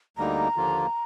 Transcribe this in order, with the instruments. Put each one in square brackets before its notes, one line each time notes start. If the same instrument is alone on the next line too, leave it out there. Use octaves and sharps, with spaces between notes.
[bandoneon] D2 D3 G3 A#3 D#4 [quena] A#5
[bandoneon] D#2 D3 F3 A#3 F4